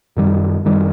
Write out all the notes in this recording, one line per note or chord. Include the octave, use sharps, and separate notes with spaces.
F#2 D#3 G3
F#2 D#3 G3